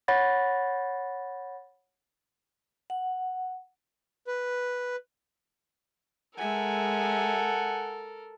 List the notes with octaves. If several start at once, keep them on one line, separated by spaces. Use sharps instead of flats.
C#5 F#5 B5 A6 A#6
F#5
B4
G#3 A4 A#4 E5 F#5 G#5